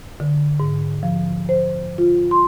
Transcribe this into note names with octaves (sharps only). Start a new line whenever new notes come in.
D3
G#2
F3
C5
F4
C6